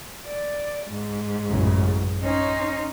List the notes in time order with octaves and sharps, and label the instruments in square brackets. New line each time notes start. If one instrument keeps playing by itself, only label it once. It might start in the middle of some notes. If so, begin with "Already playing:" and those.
[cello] D5
G#2
[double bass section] A1 F#2 C#3
[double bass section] C#4 [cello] D#4 C5